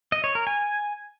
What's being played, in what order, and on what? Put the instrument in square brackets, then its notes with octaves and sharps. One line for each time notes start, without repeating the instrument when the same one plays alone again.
[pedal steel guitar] D#5
C#5
A#4
G#5